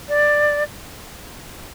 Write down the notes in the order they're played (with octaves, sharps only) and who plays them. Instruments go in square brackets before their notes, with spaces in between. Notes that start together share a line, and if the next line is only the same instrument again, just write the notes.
[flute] D5